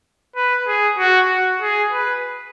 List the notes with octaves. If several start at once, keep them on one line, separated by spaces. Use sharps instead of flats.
B4
G#4
F#4
F#4
G#4
B4